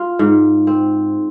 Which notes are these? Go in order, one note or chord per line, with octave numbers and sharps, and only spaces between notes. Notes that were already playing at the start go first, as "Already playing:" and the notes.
Already playing: F4
G#2
C4